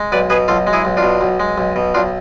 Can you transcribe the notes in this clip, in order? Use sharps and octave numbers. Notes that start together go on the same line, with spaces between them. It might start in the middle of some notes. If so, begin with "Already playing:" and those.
Already playing: G#3
B1 B4 D5
B2 G#4 B4
B1 F4 A4
G#3
E4 G#4
B1
D4 F4
B2
B1
G#3
B1
B2
B1 D4 F4